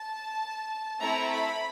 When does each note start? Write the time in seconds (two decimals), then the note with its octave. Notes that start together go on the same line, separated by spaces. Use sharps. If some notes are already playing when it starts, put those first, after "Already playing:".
Already playing: A5
1.00 A3 C4 E4 A4 A#5
1.32 B5